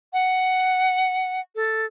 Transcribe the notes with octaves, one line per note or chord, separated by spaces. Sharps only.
F#5
A4